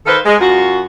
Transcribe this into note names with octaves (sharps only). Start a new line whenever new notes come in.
D#3 A4 B4 C5 F5
G#3
F#2 F4 F#4